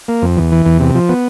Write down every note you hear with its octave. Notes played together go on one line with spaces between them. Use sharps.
A#3
F2
E2
E3
E2
C3
F3
B3